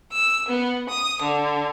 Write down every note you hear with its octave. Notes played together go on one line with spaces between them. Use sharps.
E6
B3
D#6
D3